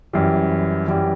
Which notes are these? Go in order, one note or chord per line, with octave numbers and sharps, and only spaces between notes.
F#2 E3 G3
F#2 E3 G3